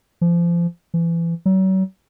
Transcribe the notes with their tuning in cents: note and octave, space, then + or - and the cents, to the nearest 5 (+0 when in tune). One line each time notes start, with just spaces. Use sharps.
F3 -30
E3 +30
F#3 +40